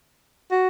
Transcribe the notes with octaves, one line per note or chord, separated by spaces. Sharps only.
F#4